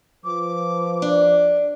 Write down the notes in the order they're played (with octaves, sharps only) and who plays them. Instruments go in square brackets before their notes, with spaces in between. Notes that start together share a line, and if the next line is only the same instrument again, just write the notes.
[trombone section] F3 B4 [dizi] D6
[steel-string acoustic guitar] D4